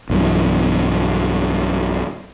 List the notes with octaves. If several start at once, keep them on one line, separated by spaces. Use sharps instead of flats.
B1 G2 B2 E3